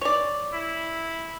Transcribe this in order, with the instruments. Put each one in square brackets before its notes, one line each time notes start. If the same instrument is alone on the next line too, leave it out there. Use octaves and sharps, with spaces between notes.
[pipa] C#5 D5
[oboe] E4